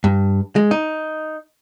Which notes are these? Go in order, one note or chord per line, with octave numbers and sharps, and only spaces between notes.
G2
G#3
D#4